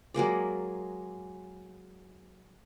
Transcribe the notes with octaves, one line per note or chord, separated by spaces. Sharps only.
F#3 G#3 A#3 D5